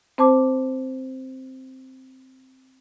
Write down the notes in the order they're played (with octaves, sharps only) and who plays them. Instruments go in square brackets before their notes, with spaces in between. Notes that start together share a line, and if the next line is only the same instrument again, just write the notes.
[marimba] C4 C5 A5 D6